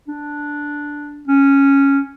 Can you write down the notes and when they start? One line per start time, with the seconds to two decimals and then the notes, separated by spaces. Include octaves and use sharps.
0.08 D4
1.28 C#4